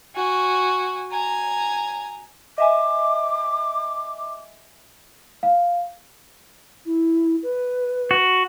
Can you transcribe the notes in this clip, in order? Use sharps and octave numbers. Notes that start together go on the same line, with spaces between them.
F#4 G#5
G#5 A#5
D#5 E5 G#5 D6
F5
E4
B4
F#4